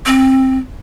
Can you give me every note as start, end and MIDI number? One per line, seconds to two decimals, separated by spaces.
0.06 0.58 60